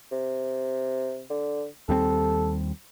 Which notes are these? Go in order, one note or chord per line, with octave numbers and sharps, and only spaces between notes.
C3
D3
D#2 G3 C4 A4